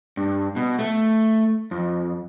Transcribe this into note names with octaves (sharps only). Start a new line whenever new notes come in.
G2
B2
A3
F2